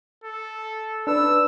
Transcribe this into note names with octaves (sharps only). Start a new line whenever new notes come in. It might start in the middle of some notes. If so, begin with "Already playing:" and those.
A4
D4 B4 E6